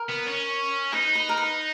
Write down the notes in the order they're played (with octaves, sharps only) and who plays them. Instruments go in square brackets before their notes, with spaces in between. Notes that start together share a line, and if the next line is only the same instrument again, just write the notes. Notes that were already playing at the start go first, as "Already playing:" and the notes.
Already playing: [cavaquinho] A#4
[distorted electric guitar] B3
C#4
[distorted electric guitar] D#4 [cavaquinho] B4
[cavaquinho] B4
A#4
B4